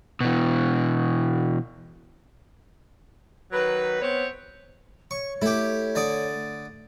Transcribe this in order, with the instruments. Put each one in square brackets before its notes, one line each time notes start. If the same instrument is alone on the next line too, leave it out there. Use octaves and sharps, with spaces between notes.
[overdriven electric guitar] B2 E3
[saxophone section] D#3 F#3 B4
B3 C4 C5 C#5
[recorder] C#5 [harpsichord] C#6
[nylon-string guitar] A3 [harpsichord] E4 G4
[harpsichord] D3 D5 D#6